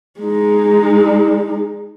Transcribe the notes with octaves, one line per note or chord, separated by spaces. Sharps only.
G#3 D#4